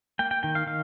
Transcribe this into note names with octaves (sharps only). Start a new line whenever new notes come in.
A#3 G5
G5
D#3 G5
F5
D#3 F5